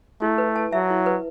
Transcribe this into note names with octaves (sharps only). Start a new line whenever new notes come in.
A3 E4
B4
A5
F#3 E5
E4
B4